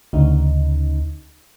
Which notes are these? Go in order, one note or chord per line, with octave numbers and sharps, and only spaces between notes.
D2 C#3 D#4